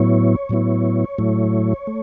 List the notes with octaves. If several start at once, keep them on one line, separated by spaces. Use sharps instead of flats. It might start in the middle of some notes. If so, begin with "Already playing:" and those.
Already playing: A2 F#3 B3 E4 C#5
A2 F#3 B3 E4
A2 F#3 A3 E4
A3